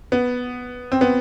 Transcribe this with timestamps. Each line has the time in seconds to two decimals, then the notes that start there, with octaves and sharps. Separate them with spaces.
0.12 B3
0.92 C4
1.01 B3